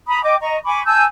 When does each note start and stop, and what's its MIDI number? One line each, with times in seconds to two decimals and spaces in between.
0.07 0.20 82
0.07 0.20 83
0.07 0.20 87
0.22 0.35 75
0.22 0.35 79
0.22 0.35 86
0.41 0.56 75
0.41 0.56 82
0.41 0.56 85
0.65 0.82 80
0.65 0.82 83
0.65 0.82 85
0.65 0.82 86
0.85 1.04 80
0.85 1.04 81
0.85 1.04 88
0.85 1.04 91